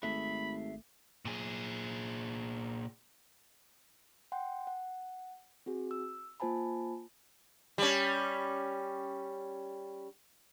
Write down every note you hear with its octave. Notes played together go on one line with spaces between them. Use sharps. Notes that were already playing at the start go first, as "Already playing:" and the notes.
G#1 A3 G#4 E5 B5
A#2 G#4
F#5 G5 C6
F#5
C4 F#4 G#4
E6
A#3 F4 C5 G#5 A5 B5
G3 C#4